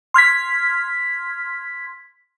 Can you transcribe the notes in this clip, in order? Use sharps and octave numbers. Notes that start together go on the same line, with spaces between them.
C6 F6 G#6 B6